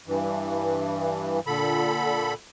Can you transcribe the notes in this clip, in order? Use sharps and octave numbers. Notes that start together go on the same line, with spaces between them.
G2 E3
A#2 D3 A4 B5